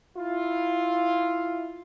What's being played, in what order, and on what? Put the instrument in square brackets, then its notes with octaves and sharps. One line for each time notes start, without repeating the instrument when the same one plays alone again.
[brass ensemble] E4 F4